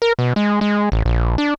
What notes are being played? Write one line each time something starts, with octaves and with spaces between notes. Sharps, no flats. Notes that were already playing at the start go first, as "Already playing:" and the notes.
A#4
B2
G#3
G#3
A1
A#1
D4